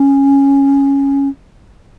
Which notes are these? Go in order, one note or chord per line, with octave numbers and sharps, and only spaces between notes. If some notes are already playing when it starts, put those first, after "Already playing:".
Already playing: C#4